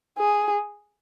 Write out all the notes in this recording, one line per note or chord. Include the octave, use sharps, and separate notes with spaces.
G#4